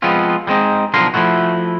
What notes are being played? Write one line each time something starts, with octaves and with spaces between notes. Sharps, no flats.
F3 G#3 B3 C4 F4
G3 G#3 C4 D#4
B1 D3 F3 A#4 C6
F3 G#3 A3 E4 F#4